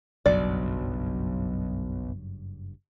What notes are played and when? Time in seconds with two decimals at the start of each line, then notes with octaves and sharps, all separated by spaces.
0.26 F#1 B1 G2 F#3 D5